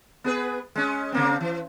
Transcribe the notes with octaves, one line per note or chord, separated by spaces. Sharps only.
B3 G#4 B4
G#3 C#4
C#3 A#3 C4
E3